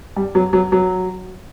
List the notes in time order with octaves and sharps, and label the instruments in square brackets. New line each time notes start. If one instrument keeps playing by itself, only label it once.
[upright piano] G3
F#3
F#3
F#3